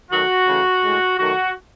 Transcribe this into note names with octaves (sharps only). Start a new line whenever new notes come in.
D#3 F#3 A3 F#4
C#3 E3 A3
A2 G#3
D#3 F#3 A3 F#4